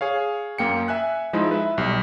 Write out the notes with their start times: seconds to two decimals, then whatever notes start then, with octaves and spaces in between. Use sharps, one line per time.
0.01 G#4 C#5 F5
0.58 F#2 A#3 G5 C#7
0.88 E5 G#5 F#6
1.33 F3 G#3 D#4 E4
1.51 B4 E5
1.78 B1 G3